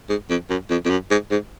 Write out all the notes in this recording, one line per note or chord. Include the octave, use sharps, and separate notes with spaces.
G#2
F2
F#2
F2
F2
F#2
G#2
G#2